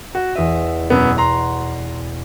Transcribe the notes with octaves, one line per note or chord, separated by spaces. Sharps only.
F#4
E2 D#5 E5 D#7
F#2 B2 B3
F#5 A#5 C6